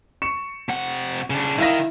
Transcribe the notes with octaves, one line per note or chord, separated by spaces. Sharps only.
C#6 C#7 E7
C3 F#5
C#3 D4
D#3 E4 F5 A#6